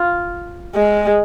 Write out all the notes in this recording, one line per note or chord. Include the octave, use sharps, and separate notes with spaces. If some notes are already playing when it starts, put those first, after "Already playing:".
Already playing: F4
G#3